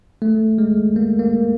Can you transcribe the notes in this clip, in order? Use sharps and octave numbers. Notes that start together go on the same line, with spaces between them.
A3
G#3
A#3
A#3